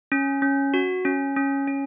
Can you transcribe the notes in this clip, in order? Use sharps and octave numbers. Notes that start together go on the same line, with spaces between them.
C#4
C#4
F#4
C#4
C#4
C#4